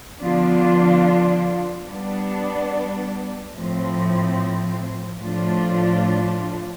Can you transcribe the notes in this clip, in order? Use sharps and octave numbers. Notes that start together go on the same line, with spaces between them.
D3 F3 B3 D4 F4
G3 B3 D4
A2 F3 C4
A2 F3 A3 D4 F4